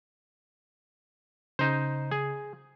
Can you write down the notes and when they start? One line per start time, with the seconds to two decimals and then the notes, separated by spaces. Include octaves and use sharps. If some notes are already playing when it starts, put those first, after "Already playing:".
1.59 C#3 D#4 C5
2.11 G#4